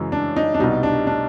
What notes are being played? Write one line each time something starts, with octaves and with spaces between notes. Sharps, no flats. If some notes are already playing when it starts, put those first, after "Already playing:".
Already playing: F#2 C#3 E3 G#3
D4
D#4
D4
C2 B2 G3 D#4
D4
D4